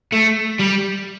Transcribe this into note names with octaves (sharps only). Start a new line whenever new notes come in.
A3
G3